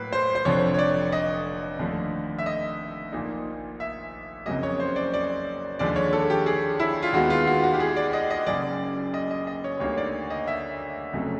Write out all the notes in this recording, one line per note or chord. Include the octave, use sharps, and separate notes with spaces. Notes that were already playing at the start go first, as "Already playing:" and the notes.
Already playing: A2 F#3 A#3 B4
C5
C5
F1 F2 D3 F3 C#5
C#5
D5
D#5
D#2 D3 F3 A3
E5
D#5
A#1 A#2 F3 A#3 D#4
E5
F#1 F2 C#3 F#3 A#3 D#5
C#5
C5
D5
D5
D#2 D3 F3 G#3 D5
C#5
A4
G4
G#4
E4
F4
D#2 D#3 G#3 B3 F#4
F4
F#4
F#4
G4
G#4
D5
D#5
D#5
F#1 F#2 C#3 D5
D#5
D#5
D#5
C#5
D2 D3 G3 A#3 D#4 C#5
D5
D#5
E5
F1 F2 C#3 F#3 A3